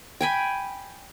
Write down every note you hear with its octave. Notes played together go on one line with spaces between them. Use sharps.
G5 G#5 B5